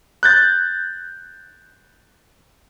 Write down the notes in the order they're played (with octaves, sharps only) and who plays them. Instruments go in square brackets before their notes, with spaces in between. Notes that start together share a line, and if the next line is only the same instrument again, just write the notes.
[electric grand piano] F#6 G6 A6